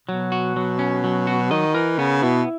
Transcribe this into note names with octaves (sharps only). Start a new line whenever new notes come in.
B2 F#3
F#4
F#3
C#4
F#3
F#4
D#3 D#5
E3 A#4
C#3 B3
B2 E4